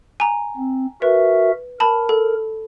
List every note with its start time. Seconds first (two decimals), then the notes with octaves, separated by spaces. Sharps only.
0.20 G#5 A#5
0.57 C4
1.02 F#4 A#4 B4 E5
1.80 A#4 A5 B5
2.09 A4